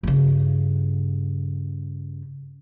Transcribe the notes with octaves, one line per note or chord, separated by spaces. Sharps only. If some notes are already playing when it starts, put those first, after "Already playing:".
G2 C#3